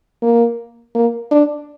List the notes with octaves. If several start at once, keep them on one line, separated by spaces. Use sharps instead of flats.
A#3
A#3
D4